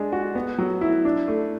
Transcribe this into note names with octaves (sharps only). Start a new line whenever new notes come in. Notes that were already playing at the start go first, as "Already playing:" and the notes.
Already playing: G#3 D4
F#4
B3
F#3
E4
D4
A3